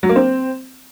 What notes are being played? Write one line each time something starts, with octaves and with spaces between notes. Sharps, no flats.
F#3
A#3
C4